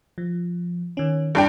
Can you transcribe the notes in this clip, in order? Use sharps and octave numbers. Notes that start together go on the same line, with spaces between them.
F3
D#3 C#4
G2 D4 G5